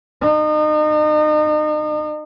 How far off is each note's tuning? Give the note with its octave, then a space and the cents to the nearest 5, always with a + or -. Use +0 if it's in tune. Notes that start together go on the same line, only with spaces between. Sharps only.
D#4 -35